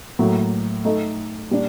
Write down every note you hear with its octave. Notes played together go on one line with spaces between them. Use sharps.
A2 F#3 A#3
A3 D#4 A4
A#2 G3 A#3 D4